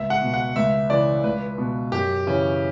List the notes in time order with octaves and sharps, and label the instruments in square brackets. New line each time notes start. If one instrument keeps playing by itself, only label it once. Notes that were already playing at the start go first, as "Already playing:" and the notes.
Already playing: [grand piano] C#2 E5
F#5
B2
F#5
C#2 E5
C#3 E3 D5
C#2 B4
B2
F#2 G4
C#3 E3 C#4